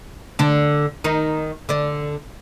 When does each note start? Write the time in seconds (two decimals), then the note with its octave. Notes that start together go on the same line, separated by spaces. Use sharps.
0.39 D3 D4
1.04 D#3 D#4
1.69 D3 D4